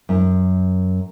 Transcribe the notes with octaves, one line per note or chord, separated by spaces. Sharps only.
F#2